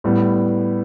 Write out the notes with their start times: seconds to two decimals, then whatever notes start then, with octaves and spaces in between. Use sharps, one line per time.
0.04 A2 G3 B3